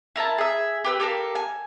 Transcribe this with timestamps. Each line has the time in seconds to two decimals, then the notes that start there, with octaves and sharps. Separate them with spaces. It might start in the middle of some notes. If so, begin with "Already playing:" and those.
0.16 E4 A#4 E5 A5
0.38 G#4 E5
0.84 G4 B4 E6
1.00 G4 A4 A#4 F5
1.35 G#5